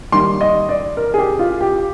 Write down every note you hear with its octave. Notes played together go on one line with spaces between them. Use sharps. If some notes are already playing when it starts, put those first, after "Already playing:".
D#3 G3 A#3 C6
D#5
D5
A#4
G#4
G4
F4
G4